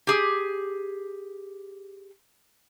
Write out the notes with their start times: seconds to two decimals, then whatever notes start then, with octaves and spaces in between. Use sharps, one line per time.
0.07 G4 G#4